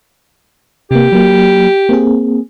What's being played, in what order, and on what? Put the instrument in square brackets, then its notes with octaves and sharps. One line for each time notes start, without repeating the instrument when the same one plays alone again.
[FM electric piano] C3 A#3 [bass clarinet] G4
[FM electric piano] F#3 A#3
A#3 C4 G#4